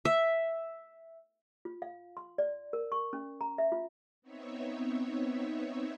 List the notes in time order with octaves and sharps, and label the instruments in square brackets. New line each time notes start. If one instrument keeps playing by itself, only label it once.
[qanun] E5
[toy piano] F4
F5
C6
D5
A#4
C#6
C#4
A#5
E5
F4
[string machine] B3 C4 D#4 C#5 E5